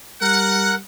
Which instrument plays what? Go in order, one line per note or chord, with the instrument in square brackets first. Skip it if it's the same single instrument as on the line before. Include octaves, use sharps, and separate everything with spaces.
[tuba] G3 [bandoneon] A#4 [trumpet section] F#5